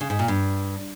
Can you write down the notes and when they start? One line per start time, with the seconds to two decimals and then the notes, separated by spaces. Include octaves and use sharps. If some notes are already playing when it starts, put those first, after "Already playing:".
0.01 C#3
0.10 G#2
0.19 A#2
0.28 G2